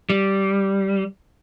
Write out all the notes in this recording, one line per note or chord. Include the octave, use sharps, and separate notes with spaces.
G3